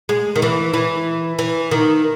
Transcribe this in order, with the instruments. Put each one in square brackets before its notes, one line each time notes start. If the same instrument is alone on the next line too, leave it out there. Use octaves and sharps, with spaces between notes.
[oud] G#3
D#3
E3
E3
E3
D#3